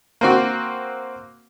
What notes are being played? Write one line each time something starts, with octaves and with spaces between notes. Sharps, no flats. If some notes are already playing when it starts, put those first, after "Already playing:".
A#3 C4 F#4